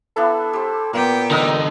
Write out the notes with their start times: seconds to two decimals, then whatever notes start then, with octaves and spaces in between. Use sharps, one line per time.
0.16 B3 D4 E4 A4
0.53 G4 C5
0.93 A#2 A#3 B3 G5
1.31 D3 D#4 A#4 D#5 E6